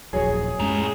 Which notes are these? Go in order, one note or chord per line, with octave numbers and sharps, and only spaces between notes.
D#1 A#1 F#3 G#4 C#5
F#2 A2 G#3 C#4 A#5